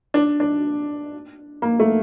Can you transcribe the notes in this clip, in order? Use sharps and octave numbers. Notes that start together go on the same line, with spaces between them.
D4
D4
A#3
A3